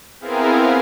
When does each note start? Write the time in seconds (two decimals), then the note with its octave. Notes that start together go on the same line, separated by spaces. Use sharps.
0.20 B3 C4 E4 G#4 A#4 F5